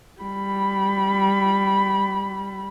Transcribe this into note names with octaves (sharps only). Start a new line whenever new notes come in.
G3 B5